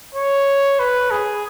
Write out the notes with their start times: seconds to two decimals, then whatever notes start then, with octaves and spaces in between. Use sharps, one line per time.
0.15 C#5
0.79 B4
1.11 G#4